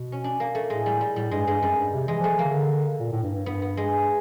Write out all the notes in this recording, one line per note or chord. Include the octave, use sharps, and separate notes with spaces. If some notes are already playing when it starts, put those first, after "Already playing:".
Already playing: B2
C#4
D4
A#3
A3
A2 G#3
G3
G3
A2 G3
G2 G#3
G2 G#3
F#2 G3
G2
C3
E3 G#3
F3
A3
E3
D3 A#3
D3
A#2
A2
G2
G2
G2 B3
B3
G#3